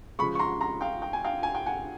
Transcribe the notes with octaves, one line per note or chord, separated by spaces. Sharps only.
C#3 F3 G#3 B5 C#6
C#6
A#5 C6
A#5 C6
F5 G5
G5
G#5
F5 G5
G#5
G5
F#5 G#5